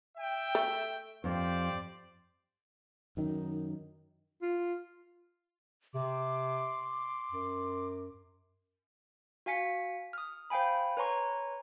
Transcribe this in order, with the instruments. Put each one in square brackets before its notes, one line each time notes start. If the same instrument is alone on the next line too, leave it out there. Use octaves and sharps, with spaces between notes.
[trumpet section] E5 G5
[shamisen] A3
[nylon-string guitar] F2 [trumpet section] G4 C5 D5
[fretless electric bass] F#2 D#3 [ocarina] D#4
[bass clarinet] F4
[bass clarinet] C3 [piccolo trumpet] C6 [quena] D6
[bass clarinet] F#2
[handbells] F#4 F5 G#5 B6 C#7
D#6 F6
C5 F5 G5 G#5 B5
B4 C#5 G#5 A#5 C6 C#6